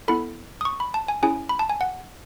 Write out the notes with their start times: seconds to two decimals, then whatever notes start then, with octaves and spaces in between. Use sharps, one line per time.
0.08 B3 E4 A4 B5
0.61 D#6
0.65 C#6
0.80 B5
0.94 A5
1.08 G#5
1.23 C#4 E4 G#4 G#5
1.49 B5
1.59 A5
1.69 G#5
1.81 F#5